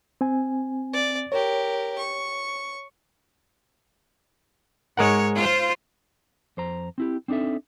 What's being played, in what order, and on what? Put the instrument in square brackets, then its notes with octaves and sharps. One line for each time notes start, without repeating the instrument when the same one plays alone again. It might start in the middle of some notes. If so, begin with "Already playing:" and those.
[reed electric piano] C4 G#5
[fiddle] D5
[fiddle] G4 A#4 [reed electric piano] C#5
[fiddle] C#6
[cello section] G#2 C#5 [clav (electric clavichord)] G#3 A#4 F#5
[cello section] F4 C5
[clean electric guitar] F2 C5 A#5
C4 E4 G4
C4 D4 D#4 A4 E5